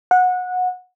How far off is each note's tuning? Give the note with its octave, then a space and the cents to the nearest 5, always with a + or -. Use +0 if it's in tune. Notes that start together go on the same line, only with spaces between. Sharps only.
F#5 -20